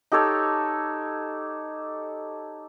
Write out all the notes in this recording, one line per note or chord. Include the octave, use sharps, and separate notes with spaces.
D#4 G4 A4 C#5